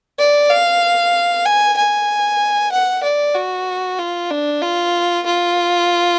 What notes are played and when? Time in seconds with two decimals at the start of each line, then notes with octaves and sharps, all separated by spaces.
0.19 D5
0.50 F5
1.45 G#5
1.77 G#5
2.72 F#5
3.03 D5
3.35 F#4
3.99 F4
4.31 D4
4.62 F4
5.26 F4